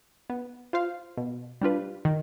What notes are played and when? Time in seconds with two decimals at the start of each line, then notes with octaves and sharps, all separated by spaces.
0.30 B3
0.73 F4 C5 F5
1.17 B2
1.61 G3 D4 F4 B4
2.05 D#3